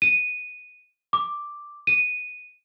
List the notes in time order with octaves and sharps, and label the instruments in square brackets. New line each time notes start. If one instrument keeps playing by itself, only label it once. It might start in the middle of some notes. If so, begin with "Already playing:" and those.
[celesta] D#7
D6
D#7